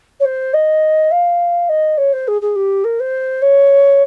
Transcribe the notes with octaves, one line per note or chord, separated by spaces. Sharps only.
C#5
C5
D#5
F5
D#5
C#5
C5
G#4
G#4
G4
A#4
C5
C#5